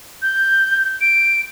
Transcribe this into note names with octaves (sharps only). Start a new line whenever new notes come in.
G6
D7